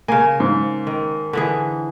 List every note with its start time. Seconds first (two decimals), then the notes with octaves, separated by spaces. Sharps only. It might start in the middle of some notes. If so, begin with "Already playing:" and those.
0.08 C#3 A#3 G#5
0.40 G#2
0.87 D#3
1.33 D3 E3 G#4